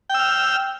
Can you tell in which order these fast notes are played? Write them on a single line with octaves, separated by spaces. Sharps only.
G5 E6 F6